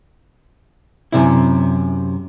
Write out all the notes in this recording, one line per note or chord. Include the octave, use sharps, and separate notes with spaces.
F#2 C3 E4